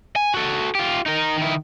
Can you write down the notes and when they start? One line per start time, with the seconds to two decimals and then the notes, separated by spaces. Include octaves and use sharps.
0.16 G#5
0.34 F#4 A4
0.75 F4 G4
1.06 D#4 A#4
1.37 D#3 E4